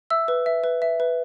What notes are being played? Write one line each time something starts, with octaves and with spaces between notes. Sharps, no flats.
E5 E6
B4
E5
B4
E5
B4